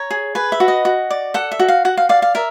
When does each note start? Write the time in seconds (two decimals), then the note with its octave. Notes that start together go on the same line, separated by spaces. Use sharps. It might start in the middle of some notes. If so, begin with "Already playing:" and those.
Already playing: C#5 A#5
0.11 G#4
0.35 B4 G#5
0.52 E5
0.60 F#4
0.68 D#5
0.85 F#4
1.10 D5
1.34 A4 F#5
1.52 E5
1.59 F#4
1.68 F5
1.85 F#4 F#5
1.97 F5
2.09 D5 F5
2.22 F5
2.35 A#4 E5